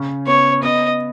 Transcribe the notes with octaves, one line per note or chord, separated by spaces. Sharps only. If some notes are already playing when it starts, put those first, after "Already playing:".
Already playing: C#3 C#4
B3 C#5
B3 D#5